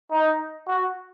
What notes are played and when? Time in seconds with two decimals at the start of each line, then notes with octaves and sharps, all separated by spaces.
0.10 D#4
0.67 F#4